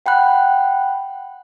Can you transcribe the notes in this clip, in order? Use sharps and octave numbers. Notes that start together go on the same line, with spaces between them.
F#5 G5 B5 F#6